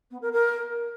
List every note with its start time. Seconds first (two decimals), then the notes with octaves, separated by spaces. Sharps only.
0.10 B3
0.21 A#4
0.32 A#4